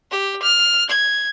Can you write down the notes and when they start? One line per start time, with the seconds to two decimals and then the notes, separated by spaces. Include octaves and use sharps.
0.11 G4
0.42 F6
0.89 G#6